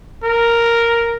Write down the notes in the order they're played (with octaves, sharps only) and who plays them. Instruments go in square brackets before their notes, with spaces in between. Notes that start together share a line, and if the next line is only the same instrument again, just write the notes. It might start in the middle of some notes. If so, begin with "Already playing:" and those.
[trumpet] A#4